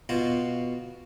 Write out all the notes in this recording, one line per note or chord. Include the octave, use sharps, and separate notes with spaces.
B2 F4 F#4